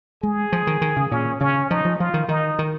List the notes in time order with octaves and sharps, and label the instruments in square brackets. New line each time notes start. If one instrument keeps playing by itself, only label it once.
[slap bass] G#3 [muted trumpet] G#4
[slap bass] F3
D#3
D#3
C#3
[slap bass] A#2 [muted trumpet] C#4
[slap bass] C#3 [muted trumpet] C#4
[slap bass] F3 [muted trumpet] D#4
[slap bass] F3
[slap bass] F3 [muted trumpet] F4
[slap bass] D#3
[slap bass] D#3 [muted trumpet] D#4
[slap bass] D#3